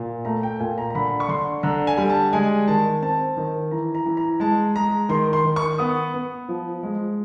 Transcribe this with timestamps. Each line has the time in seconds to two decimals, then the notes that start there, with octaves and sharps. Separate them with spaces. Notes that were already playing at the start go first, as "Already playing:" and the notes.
Already playing: A#2
0.25 A3 A#5
0.43 G5
0.59 A#2 G#5
0.78 A#5
0.90 A#5
0.95 D3 B5
1.20 C#6
1.29 D3 C6
1.63 D3 A#5
1.87 G#5
1.98 G3
2.09 A5
2.33 G#3 G#5
2.67 D#3 A5
3.01 C4 A5
3.37 D#3
3.71 E3 A#5
3.95 A#5
4.06 E3
4.17 A#5
4.40 G#3 A5
4.76 G#3 A#5
5.09 D#3 C6
5.33 C6
5.44 D#3
5.56 C#6
5.78 B3 D#6
6.14 B3
6.49 F3
6.83 G#3